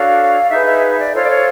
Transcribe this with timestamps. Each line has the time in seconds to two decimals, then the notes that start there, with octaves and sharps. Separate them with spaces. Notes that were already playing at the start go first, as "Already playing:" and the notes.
Already playing: D4 F#4 A4 C#5 F5
0.49 D#4 G#4 B4 E5
0.66 E5
0.98 D5
1.13 F4 A4 C5 C#5
1.24 D5
1.29 C#5